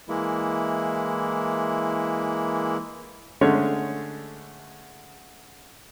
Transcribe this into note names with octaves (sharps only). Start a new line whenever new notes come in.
E3 G#3 A#3 E4
D3 G#3 A3 C#4 C#5